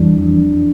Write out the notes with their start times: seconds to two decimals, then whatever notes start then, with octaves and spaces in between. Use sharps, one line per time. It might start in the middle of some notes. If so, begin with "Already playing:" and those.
Already playing: F2 E3 G3 D4
0.18 F2